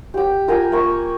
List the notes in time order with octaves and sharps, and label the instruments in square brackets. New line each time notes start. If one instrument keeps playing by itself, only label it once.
[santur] G4 G5
F4 A#4 G5 G#5
A#3 C#6 E6